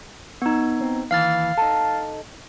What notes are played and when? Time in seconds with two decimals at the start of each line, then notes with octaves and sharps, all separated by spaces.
0.42 B3 D#4
0.80 C4
1.11 D#2 E3 F5 F6 A6
1.57 D#4 A4